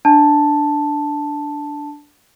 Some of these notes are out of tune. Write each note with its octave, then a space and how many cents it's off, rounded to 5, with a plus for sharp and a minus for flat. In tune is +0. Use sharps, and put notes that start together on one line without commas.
D4 +0 A5 +0